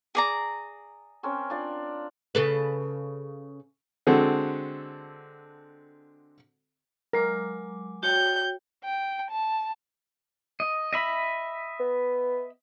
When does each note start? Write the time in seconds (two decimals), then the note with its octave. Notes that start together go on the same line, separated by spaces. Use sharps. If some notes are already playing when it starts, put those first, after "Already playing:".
0.15 G#4 D5 A#5
1.23 C4 C#4 A#4
1.50 D4 F4 D5
2.35 C#3 A4 B4
4.07 D3 G#3 C4 F#4 A4
7.13 F#3 G#3 A#4 D6
8.03 F#4 C#5 G5 G6
8.84 G5
9.30 A5
10.60 D#5
10.93 D#5 E5 B5
11.80 B3